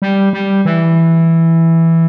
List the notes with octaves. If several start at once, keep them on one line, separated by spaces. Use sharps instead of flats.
G3
G3
E3